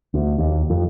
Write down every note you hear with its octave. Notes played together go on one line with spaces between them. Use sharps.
D2
D#2
F2